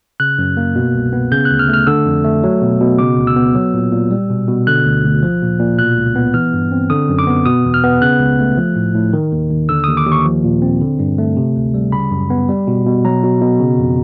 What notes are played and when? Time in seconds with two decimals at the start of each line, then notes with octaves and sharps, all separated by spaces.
0.20 C#3 F#6
0.39 F#2
0.57 A#3
0.76 B2
0.95 C2
1.13 B3
1.32 C#3 G6
1.45 F#6
1.50 D2
1.59 F6
1.68 A3
1.74 F6
1.87 D3 E6
2.06 F2
2.24 A3
2.44 F#3
2.62 B2
2.81 B2
2.99 C#3 D6
3.18 D2
3.27 E6
3.36 B3
3.55 F#3
3.74 A#2
3.92 A#2
4.11 G3
4.29 B2
4.47 B2
4.67 D3 F#6
4.85 D2
5.04 D2
5.22 F3
5.42 A#2
5.59 A#2
5.78 B2 F#6
5.97 C#2
6.16 B3
6.34 E3 F6
6.53 G2
6.72 C4
6.90 D3 D#6
7.09 F#2
7.19 D6
7.27 B3
7.46 B2 D#6
7.65 E2
7.74 F6
7.84 B3
8.01 C#3 F#6
8.20 C#2
8.39 A3
8.57 F3
8.76 A2
8.95 A2
9.13 D#3
9.32 D#2
9.50 D#2
9.69 D3 E6
9.84 D#2 D#6
9.97 D6
10.06 D#2
10.12 C#6
10.25 F3
10.44 A#2
10.62 C4
10.81 D3
10.99 G2
11.18 A3
11.37 C3
11.56 D2
11.74 G3
11.92 C#3 B5
12.11 F#2
12.30 B3
12.49 G3
12.67 B2
12.86 B2
13.05 F#3 A#5
13.23 B2
13.41 B2
13.60 C#3
13.78 F2